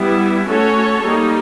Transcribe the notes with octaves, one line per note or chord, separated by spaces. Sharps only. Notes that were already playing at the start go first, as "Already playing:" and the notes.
Already playing: G3 B3 E4
A3 C#4 F#4 A4 C#5
G3 A#3 D#4